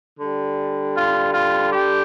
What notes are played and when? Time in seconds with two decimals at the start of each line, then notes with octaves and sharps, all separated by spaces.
0.18 D3 G3
0.96 F4
1.34 F4
1.71 G4